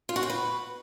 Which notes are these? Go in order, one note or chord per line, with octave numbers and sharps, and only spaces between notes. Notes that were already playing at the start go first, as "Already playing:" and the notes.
F4
F#4
G5
B4